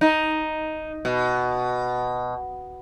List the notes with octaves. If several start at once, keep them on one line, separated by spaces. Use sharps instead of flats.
D#4
B2